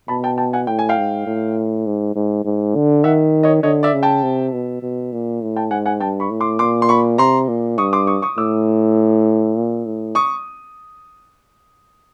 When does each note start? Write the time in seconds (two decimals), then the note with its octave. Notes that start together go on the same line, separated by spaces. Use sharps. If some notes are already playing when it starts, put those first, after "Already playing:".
0.08 B2 A5 B5
0.24 G5 A5
0.38 G5 A5
0.53 F#5 G#5
0.67 A2 G5
0.79 G#5
0.89 F5 G5
0.98 G#2
1.26 A2
1.86 G#2
2.15 G#2
2.45 G#2
2.75 D3
3.04 D#3 E5 F#5
3.43 C#5 D#5
3.63 D3 C#5 D#5
3.83 D5 E5
3.93 C#3
4.03 G5 A5
4.23 C3
4.53 B2
4.82 B2
5.12 A#2
5.42 A2
5.56 G5 A5
5.71 G#2 F#5 G#5
5.86 F#5 G#5
6.00 G2 G5 A5
6.20 B5 C#6
6.30 A2
6.41 C6 D6
6.59 A#2 C6 D6
6.82 C6
6.89 B5 C#6
7.18 C3 A#5 C6
7.48 A#2
7.78 G2 C#6 D#6
7.93 C6 D6
8.07 C#6 D#6
8.22 C#6 D#6
8.38 A2 D6 E6
9.56 A#2
9.86 A2
10.15 C#6 D#6